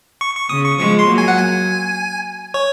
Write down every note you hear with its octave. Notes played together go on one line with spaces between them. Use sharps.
C#6
C#6
C#3 D#6
C#6
F3 G#3 C#6
C6
F#3 A#3
G#5
F#5
G#5
C#5